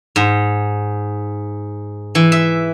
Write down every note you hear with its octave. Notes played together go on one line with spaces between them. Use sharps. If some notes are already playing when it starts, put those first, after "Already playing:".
G#2
E3
E5